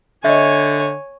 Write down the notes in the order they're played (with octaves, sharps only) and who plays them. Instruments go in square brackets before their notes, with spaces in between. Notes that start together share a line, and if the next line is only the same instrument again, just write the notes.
[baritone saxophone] D3 [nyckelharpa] C#5 G#5 [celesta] D#5 E5